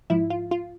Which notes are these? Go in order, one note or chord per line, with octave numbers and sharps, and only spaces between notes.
G#2 F3 E4
F4
F4